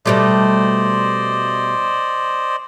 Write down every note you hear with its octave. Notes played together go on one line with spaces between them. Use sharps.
B2 G3 A3 C5 D5 D#5